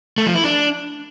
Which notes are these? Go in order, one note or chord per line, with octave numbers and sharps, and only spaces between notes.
A3
F3
E4
D4